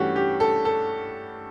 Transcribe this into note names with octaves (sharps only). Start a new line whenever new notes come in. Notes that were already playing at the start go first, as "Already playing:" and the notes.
Already playing: G2 E3 A3 C#4 F#4 G4
G4
A4
A4